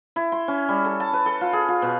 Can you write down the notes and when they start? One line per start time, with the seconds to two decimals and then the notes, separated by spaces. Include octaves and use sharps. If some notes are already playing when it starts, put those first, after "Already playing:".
0.16 E4
0.32 C6
0.48 C#4
0.69 G3
0.85 A4
1.00 A5
1.13 B4
1.26 A4
1.41 F4
1.53 G#4
1.68 F4
1.82 B2